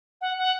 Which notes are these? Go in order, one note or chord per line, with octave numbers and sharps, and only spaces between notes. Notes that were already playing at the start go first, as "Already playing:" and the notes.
F#5
F#5